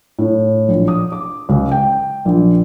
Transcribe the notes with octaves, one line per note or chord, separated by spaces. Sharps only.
A2
A#1
D#6
D6
C#2
G5
A#1